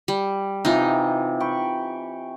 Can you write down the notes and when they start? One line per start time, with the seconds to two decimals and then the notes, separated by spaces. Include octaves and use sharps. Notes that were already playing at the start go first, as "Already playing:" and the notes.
0.08 G3
0.65 C3 E3 D#4 F4
1.40 G5 B5 C#6